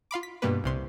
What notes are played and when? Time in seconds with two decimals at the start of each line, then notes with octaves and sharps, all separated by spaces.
0.11 F4 F5 B5 D6
0.23 B6
0.42 G2 B2 G3 A#3 B4
0.64 C2 C3 C6